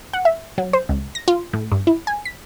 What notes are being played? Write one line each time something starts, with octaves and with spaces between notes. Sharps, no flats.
F#5
E5
F#3
C5
C#2
A#6
F4
A2
G2
E4
G#5
B6